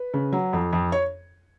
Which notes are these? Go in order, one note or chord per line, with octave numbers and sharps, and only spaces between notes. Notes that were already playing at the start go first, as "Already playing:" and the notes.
Already playing: B4
C#3
F#3
F2
F2
C#5